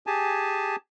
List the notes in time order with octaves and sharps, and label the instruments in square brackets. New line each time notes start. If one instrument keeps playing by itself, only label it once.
[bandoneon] G4 G#4 G#5 A5